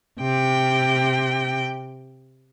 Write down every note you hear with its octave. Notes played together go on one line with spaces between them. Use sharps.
C3 G5